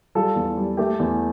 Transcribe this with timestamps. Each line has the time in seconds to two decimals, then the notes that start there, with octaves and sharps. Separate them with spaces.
0.15 G3 F4 A4
0.36 E2
0.57 G3
0.77 A3 G4
0.99 E2